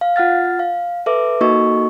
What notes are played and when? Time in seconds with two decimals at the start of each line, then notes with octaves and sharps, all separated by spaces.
0.01 F5
0.16 F4 F#5 F6 A6
0.59 F5
1.06 A4 B4 E5 D6
1.41 A#3 D#4 F#4 A4 D#5 C#6